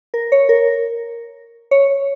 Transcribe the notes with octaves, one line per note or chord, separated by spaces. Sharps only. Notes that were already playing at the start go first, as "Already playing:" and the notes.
A#4
C#5
A#4
C#5